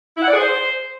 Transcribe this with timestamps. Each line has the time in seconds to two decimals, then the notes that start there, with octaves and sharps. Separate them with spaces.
0.17 E4
0.22 F#5
0.28 D5
0.33 G#4
0.39 C5